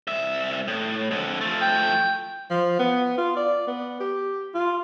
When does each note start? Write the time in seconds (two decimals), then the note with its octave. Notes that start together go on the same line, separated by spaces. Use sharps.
0.07 C2 E5
0.68 A2
1.11 F2 D3
1.41 F3 A3
1.61 G5
2.51 F3
2.79 B3
3.18 F4
3.37 D5
3.68 B3
4.00 G4
4.55 F4